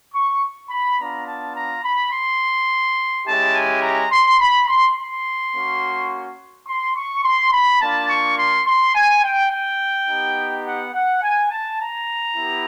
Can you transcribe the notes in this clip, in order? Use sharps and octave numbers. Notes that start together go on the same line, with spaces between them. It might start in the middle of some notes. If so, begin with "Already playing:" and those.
C#6
B5
B3 D4 F4 A#5
A5
A#5
B5
C6
G#3 C#4 E4 G4 A5
G#5
A#5
C6
B5
C6
C6
A#3 C#4 F#4
C6
C#6
C6
B5
A#3 D4 F4 A5
C#6
C6
C6
G#5
G5
G5
B3 D#4 G4
F#5
F#5
G#5
A5
A#5
B3 E4 G4